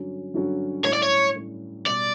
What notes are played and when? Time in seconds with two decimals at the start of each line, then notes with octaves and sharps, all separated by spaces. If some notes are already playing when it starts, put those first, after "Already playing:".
Already playing: G2 D3 F#3 C#4 F#4
0.34 G2 D3 F#3 C#4 F#4
0.84 A2 G3 C#4 C#5
0.93 D5
1.02 C#5
1.36 A2 G3 C#4
1.86 B2 G3 D5